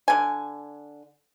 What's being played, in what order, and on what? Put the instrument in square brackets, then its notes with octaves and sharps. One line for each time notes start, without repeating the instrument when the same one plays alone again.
[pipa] D3 G#5